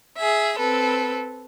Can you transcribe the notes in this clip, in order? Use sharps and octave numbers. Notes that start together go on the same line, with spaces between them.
G#4 E5
C4 A4 B4